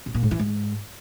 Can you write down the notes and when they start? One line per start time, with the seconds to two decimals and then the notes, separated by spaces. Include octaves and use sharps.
0.06 C3
0.14 A#2
0.23 G#2
0.31 E3
0.39 G#2